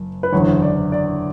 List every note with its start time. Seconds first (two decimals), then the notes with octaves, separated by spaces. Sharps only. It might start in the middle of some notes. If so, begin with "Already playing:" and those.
Already playing: F#1
0.23 B4
0.32 F#1 E2 D3 C#5
0.62 D5
0.92 D5